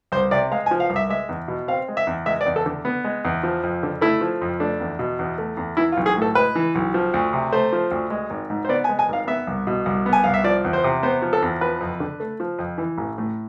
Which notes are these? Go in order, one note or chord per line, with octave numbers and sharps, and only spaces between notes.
C2 C5
C3 D5
G#3 F5
G#5
F3
F5
C2
E5
G#3 E5
E2
B2
C4 F5
G#3
E5
E2
G#3 E5
D5
E2
A4
D3
B3
G#3
E2
F3
F2
D3
A3 E4
F3
F2
A3 D4
E2
B2
E2
A3
E2
E3 E4
F4
B1
G#4
A2
A4
G#3 B4
E3
B1
F3
D2
C3
A3 C5
F3
D2
G#3
G#1
G#2
C5
B3 D5
G#5
G#3
G#5
G#1 F5
B3 E5
C2
B2
C2
B3
G#5
C2 F5
E5
F3 D5
E2
C5
C3
B3 C5
F3
A4
E2
F3 B4
F2
D3
A3
F3
F2
E3
A1
A2